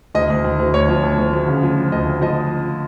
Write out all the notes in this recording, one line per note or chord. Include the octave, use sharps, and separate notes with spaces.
D2 D#5
D2
D2
D2
D2 C#5
F3
D2
D2
D2
C#3
F3
F3
D2 D#5
D2
F3 D#5